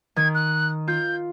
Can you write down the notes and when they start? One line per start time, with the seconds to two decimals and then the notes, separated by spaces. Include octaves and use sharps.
0.16 D#3 G#6
0.34 F#6
0.88 F4 G6